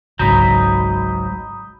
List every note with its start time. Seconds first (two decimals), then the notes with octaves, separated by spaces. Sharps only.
0.19 G#1 C#2 G#2 F#3 A#5 B5 D#6 G6